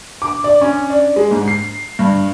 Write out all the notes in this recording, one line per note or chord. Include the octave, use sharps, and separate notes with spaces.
D6
D5
C#4
D4
G#3
G#2
C7
G2